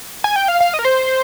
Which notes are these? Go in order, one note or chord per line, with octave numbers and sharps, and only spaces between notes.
G#5
G5
F5
F5
D#5
A#4
C5